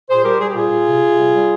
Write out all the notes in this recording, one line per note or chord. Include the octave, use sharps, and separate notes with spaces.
A#2 G#4 C5
G3 G4 A#4
G3 G#4
G4
A#2 F4 G#4
A#2
C3
C3
G3
G3